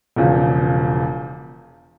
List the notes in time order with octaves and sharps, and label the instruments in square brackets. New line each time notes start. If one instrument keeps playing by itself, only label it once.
[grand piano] E1 E2 C#3 F3